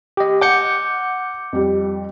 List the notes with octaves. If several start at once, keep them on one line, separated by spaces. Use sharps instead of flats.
G4 D#5
F#5 D6 G6 C#7
F2 G3